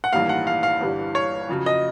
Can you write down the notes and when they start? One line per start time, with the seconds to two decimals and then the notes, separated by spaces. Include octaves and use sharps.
0.04 F#5
0.12 A1 G2 D#3 G3 A#3 F5
0.29 F#5
0.47 F5
0.63 F5
0.80 G1 G2 E3 G3
1.15 C#5
1.49 F2 C#3 F#3
1.66 D#5